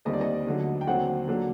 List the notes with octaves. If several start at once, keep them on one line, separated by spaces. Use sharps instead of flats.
D#2 D3 G3 C4 D#5
D5
D#5
D2 D3 F#3
G5
D#2 D3 F#3 C4 F#5
D3 F#3 A#3